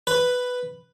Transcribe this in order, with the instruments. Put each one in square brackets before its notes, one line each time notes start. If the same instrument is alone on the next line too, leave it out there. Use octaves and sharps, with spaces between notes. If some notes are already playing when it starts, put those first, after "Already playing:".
[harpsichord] B4